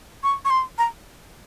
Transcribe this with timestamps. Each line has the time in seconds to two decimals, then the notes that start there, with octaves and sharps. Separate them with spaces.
0.23 C#6
0.45 C#6
0.50 C6
0.78 A#5